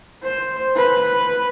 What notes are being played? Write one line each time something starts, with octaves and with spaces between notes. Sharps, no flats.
C5
B4